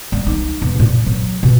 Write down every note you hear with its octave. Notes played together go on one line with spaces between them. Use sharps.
G3
D#4
E1
A#2
F#3
B2